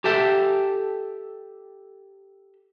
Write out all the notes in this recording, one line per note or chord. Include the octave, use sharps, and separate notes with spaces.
G4 A4 E5 G5